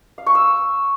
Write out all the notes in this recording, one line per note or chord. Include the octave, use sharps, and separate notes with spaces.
F5
C#6
E6